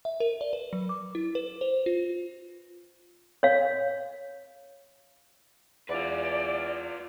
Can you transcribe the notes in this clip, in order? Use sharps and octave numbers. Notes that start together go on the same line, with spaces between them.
E5
A#4
D5
B4
F#3
D6
E4
B4
C5
F4
C#5 F5
E2 F4 B4 D5